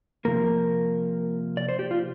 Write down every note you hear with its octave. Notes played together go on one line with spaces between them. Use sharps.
C3 F3 A#3 A#4
D5
C5
G4
F4